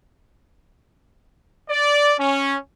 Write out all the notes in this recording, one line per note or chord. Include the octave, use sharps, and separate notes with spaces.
D5
C#4